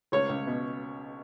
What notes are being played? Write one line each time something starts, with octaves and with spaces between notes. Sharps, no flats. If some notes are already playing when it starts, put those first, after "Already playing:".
C#2 C#5
C#2
B2